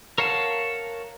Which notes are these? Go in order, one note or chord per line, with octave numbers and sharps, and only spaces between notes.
A#4 C#5 F5 F#5 A5